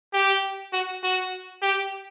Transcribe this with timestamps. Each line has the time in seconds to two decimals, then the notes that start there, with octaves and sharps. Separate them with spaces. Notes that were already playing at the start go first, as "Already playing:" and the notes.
0.13 G4
0.73 F#4
1.03 F#4
1.62 G4